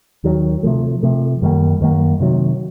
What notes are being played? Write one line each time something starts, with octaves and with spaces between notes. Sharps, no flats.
D#2 D#3 F#3
C3 F3 A3
C3 F3 A3
F#2 D#3 G3 A#3
F#2 D#3 G3 A#3
C3 D#3 F#3